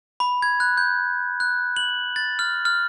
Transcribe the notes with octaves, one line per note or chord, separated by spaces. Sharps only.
B5
G#6
F#6
G6
F#6
F#7
A6
F6
F6